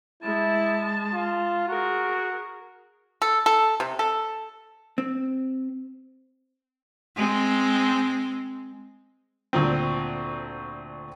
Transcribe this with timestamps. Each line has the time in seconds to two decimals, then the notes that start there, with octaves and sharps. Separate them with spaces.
0.23 G#3 E4 A5
1.14 F4
1.68 F#4 G#4 A#4
3.22 A4
3.46 A4
3.80 C3
3.99 A4
4.98 C4
7.16 G#3 C4
9.53 D2 A#2 C4